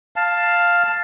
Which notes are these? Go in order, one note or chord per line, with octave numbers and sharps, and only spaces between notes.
F5 A5